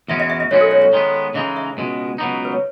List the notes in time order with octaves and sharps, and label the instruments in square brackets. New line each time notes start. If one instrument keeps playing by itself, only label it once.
[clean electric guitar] E2 B2 G#3 C#4 [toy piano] E5
[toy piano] D#5
E5
D#5
[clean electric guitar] B1 B2 G#3 C#4 F#4 [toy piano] C#5
[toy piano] A4
C#5
C#5
[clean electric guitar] D#3 G#3 B3
[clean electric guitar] C#3 E3 G#3 D#4 [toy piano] D#5
[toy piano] E5
[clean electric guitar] C#2 B2 G#3
C#2 B2 F#3 B3 D#4
[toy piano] B4
C#5